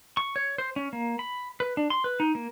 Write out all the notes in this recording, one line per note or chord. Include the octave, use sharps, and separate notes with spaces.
C#6
C#5
C5
C#4
A#3
B5
B4
D4
C6
B4
D#4
A#3